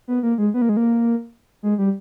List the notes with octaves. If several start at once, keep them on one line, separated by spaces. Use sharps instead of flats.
B3
A#3
G#3
B3
A#3
G#3
A#3
G#3
G3